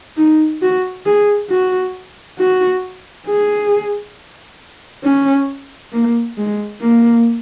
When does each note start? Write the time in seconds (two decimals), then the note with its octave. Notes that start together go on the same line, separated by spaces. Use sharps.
0.17 D#4
0.62 F#4
1.06 G#4
1.50 F#4
2.39 F#4
3.27 G#4
5.04 C#4
5.92 A#3
6.37 G#3
6.81 A#3